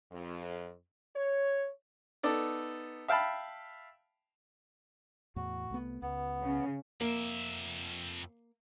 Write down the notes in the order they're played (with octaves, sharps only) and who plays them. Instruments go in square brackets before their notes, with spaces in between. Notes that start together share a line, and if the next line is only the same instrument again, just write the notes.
[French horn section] F2
C#5
[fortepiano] B3 D#4 A4 D5
E5 F5 G5 A5 B5
[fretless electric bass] E2 A2 [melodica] F#4
[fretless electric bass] C2 A3 B3
[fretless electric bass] C#2 [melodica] B3
[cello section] C#3
[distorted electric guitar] F2 E5 [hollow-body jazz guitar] A#3